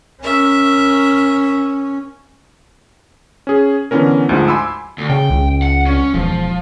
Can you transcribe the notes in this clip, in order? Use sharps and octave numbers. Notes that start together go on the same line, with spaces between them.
C#4 A#4 E5
C#4 G#4
D3 E3 B3 C#4 A#4
D2 G#2 F3
G#5 B5 C6 D6 E6
D2
C#3 G5
C#2
F#5
C#4
E1 F3